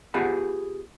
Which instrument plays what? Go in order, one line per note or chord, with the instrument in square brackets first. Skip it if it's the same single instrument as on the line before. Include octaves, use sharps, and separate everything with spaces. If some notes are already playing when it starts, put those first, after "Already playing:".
[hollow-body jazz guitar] B3 F4 G4 G#4 F#5 B5